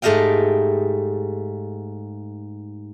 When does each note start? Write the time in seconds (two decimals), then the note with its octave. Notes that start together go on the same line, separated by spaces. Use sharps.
0.02 G#2 A3 G4 D#5 F5 G5